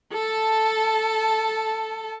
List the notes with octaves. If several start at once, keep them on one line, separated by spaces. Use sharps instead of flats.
A4 A5